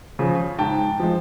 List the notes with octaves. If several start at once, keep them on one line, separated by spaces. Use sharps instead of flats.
C#3 F3
G#2 G5 A5
F3 G#3